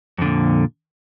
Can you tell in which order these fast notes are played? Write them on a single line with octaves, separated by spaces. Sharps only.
F2 D3 A#2